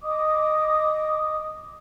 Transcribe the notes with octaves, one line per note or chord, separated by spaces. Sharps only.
D#5 D6 D#6